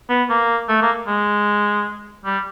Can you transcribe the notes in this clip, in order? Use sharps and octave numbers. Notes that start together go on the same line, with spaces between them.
B3
A#3
A3
A#3
G#3
G3